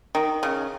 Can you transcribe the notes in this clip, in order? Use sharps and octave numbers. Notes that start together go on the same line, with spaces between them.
D#3
C#3